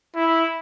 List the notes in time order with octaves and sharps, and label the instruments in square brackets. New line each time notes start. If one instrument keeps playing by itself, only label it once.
[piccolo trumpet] E4